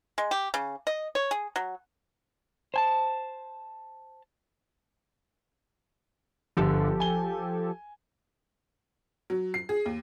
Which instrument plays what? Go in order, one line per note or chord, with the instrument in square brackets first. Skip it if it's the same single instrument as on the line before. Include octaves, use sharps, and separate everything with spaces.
[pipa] G#3
G4
C#3
D#5
C#5
G#4
F#3
[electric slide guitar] C5 G#5 A5
[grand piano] G1 D3 [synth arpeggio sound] F3 G4 A4
[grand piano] G#5 G7
[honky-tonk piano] F#3
C7
G#4
D#2